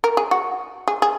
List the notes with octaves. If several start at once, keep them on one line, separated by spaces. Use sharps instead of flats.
A#4
G#4
F#4
G#4
G#4